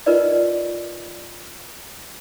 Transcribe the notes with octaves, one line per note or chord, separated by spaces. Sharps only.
D#4 F4 A#4 B4 D5 D#5